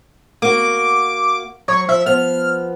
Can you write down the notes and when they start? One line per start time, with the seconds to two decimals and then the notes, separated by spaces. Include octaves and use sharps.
0.42 A#3 F#4 D6
1.68 F#3 C#5
1.89 F3 E5
2.06 F3 B3 F6